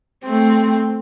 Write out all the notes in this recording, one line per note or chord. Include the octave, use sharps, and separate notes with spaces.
A3 C4